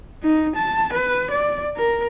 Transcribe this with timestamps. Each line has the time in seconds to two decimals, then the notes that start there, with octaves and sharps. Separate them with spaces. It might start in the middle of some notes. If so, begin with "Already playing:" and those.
0.23 D#4
0.56 A5
0.93 B4
1.31 D5
1.77 A#4